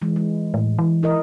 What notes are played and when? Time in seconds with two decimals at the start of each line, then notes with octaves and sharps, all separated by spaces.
0.02 E3 G#3
0.16 G#3
0.54 A2
0.79 E3
1.03 E4 A#4 D#5